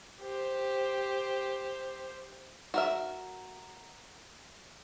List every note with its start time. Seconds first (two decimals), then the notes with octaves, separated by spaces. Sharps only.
0.22 G4 C5
2.74 F#4 A#4 E5